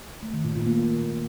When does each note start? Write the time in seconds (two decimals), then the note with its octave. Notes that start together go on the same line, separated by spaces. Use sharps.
0.23 A3
0.34 D#3
0.45 A#2
0.55 A#2
0.66 A#3